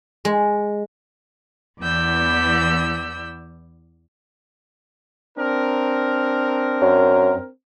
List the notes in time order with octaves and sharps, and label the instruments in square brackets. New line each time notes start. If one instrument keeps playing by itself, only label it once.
[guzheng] G#3
[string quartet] E2 E3 B3 D5 E6 G6
[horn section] C4 D4 A#4
[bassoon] F#2